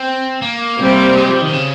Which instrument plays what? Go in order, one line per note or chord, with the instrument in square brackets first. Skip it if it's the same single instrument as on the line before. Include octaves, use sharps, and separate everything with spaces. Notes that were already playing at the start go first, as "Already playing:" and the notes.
Already playing: [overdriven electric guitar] C4
A#3
[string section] C3 G3 C4 G4
[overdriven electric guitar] G#3
F3
D#3
C3
C#3